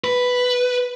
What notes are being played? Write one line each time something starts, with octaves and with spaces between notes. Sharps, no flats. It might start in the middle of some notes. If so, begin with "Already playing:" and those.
B4